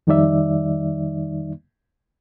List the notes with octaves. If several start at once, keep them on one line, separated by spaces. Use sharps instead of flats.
F2 D#3 G3 D#4 D5 E5